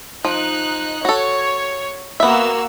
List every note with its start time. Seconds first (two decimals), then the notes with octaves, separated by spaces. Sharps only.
0.25 F3 D#4 F#6
1.05 F#4 A4 C#5
2.20 A#3 B3 F#4 E5 E6